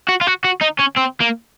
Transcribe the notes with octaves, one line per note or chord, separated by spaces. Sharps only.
F#4
F4
F#4
F#4
D#4
C#4
C4
A#3